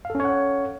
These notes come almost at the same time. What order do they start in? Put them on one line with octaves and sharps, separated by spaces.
F5 A4 C#4 C#5 F#5